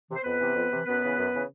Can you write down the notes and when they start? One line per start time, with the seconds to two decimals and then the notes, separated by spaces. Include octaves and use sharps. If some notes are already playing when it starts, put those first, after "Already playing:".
0.09 C3 E3
0.16 C5
0.24 F2 B3 B4
0.39 C3 E3
0.55 F2
0.71 C3 E3
0.86 F#2 B3 B4
1.02 C#3 E3
1.17 F#2
1.33 C#3 E3